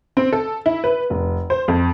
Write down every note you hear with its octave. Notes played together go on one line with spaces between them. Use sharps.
C4
A4
E4
B4
F1
C5
F2